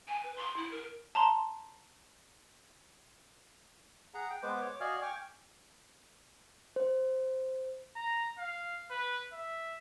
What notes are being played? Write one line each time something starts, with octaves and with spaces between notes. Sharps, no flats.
G#5
B4
C6
E4
A#4
A5 A#5 C6
G#4 F#5 A#5
G5
G#3 B3 B4 C5 D6
C#5 D6
F#4 D5 D#5 F5 G#5 F6
G5 G#5 C#6 D6 F6
C5
A#5
F5
B4
E5